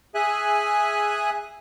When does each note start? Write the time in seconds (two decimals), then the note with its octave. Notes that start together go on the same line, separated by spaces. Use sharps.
0.15 G#4 E5 G#5 F#6